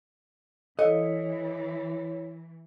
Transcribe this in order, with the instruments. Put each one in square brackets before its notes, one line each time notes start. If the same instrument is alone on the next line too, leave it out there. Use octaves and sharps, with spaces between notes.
[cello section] E3 [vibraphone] E4 C#5 [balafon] A4 F5 [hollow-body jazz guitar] D#5